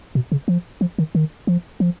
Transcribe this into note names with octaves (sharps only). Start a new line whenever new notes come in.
B2
C#3
F3
F3
D#3
D#3
F3
F3